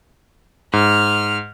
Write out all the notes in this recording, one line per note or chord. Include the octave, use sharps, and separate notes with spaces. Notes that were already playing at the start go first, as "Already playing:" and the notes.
G#2 F6